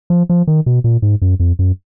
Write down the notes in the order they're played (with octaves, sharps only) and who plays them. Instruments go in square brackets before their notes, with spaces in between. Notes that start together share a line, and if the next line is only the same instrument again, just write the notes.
[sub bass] F3
F3
D#3
B2
A#2
G#2
F#2
F2
F#2